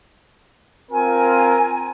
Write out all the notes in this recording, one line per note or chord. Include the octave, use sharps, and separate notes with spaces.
C4 F4 A#4 G#5